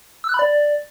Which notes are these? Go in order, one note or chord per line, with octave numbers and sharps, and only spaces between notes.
E6
F#6
B5
D5